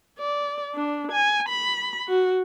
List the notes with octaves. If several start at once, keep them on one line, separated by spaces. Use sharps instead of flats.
D5
D4
G#5
B5
F#4